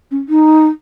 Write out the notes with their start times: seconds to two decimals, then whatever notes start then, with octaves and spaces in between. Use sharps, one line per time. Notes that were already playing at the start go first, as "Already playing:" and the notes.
0.11 C#4
0.29 D#4